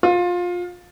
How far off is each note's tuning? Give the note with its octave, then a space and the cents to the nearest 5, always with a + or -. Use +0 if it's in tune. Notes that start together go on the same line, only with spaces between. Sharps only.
F4 +20